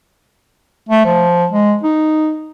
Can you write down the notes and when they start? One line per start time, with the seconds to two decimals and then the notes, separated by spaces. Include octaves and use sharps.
0.89 A3
1.06 F3
1.52 G#3
1.83 D#4